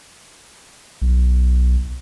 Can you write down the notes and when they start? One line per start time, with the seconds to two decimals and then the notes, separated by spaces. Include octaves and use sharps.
1.02 B1